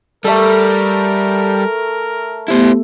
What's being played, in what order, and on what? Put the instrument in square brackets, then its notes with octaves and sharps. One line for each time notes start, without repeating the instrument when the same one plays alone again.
[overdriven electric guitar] G3 [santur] A3 A4 [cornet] A#4
[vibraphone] A3 B3 G4 [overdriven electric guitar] E4 C5